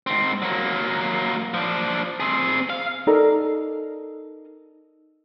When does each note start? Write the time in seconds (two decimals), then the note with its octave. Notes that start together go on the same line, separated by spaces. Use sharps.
0.07 G#2 C4
0.42 F#3 A#3
1.54 F3 D4
2.20 C4 G#4
2.70 F5
3.07 D#4 A4 A#4 D5